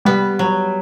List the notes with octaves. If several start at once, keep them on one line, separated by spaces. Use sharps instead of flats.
G3 B3
F#3